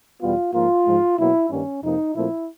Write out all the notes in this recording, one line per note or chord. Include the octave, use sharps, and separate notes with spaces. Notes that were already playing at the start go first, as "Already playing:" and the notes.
E2 B2 G3 B3 F4
G#2 F3 A#3 F4
G#2 F3 G#3
B2 F#3 A#3 E4
G2 D#3 G3 A#3 C#4
F2 C3 F3 A#3 D#4
A#2 F3 A3 C4 E4